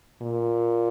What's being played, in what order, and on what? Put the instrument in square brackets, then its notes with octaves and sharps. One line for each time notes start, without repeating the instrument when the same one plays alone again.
[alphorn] A#2